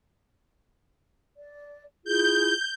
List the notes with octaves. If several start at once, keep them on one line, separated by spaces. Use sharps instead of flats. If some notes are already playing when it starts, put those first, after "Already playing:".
D5
E4 F4 G#4 G6